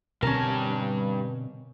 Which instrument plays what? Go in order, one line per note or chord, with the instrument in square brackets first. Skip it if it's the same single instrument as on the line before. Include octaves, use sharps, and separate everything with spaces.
[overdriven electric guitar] G2 A5 [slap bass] B2 D3 C4 [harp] C#4 A#4